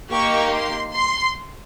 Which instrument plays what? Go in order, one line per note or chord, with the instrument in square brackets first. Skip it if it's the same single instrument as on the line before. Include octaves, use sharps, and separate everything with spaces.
[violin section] A#3 D#4 G4 C#6
C6
C6